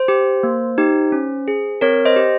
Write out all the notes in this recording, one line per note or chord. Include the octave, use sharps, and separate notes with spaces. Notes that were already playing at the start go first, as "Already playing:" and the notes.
Already playing: C5
G4
A#3
D#4 G4
C#4
G#4
C4 A#4 C#5
C5 D#5
G4